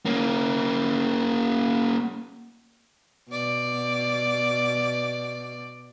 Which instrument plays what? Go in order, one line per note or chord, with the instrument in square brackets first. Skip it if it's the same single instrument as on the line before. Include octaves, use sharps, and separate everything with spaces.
[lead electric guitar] A#3 C#4
[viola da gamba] B2 D5